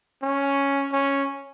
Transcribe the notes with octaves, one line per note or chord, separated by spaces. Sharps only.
C#4
C#4